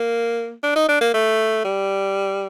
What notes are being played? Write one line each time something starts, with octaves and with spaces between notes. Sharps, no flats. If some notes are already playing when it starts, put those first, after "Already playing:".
Already playing: A#3
D4
D#4
D4
A#3
A3
G3